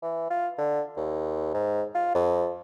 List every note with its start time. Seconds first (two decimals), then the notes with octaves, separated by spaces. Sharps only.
0.03 E3
0.30 F4
0.58 D3
0.97 D#2
1.54 G#2
1.95 F4
2.15 F2